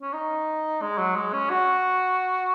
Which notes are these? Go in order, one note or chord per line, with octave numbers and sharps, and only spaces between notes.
C#4
D#4
G#3
F#3
G#3
C#4
F#4